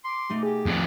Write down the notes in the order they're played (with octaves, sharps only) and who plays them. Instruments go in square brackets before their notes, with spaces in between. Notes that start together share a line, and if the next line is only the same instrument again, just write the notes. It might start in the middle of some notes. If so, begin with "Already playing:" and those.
[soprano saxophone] C6 [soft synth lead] D6
[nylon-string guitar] B2 A3 D#4
[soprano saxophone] G4 [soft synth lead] G#4
[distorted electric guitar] F2 D5